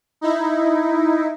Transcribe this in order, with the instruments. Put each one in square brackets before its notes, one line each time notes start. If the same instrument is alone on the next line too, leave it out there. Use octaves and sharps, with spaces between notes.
[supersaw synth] D#4 E4